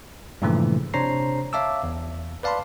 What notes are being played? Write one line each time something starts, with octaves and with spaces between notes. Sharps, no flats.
G2 A#2 C#3 E3 F3 A3
C3 D4 C5 C#5 A#5 C7
C#5 E5 F5 A5 D6 E6
E2
B4 D5 F5 A5 B5 C6